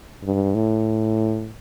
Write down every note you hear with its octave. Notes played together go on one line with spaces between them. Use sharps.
G2
A2